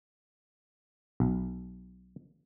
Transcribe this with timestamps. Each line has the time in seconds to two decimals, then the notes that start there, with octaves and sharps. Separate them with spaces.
1.20 B1